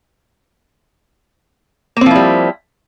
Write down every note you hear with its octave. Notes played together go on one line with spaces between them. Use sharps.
F3 G3 A#3 C4 E4